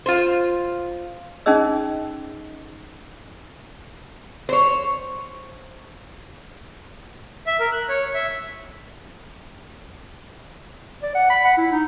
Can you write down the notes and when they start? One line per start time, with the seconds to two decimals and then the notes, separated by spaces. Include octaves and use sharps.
0.06 F4 C5
1.46 C#4 D#4 G#4 D#5 E6
4.49 C5 C#5
7.47 E5
7.60 A#4
7.72 F#6
7.89 C#5
8.14 E5
11.03 D5
11.15 F#5
11.30 B5
11.45 F#5
11.58 E4
11.72 D#4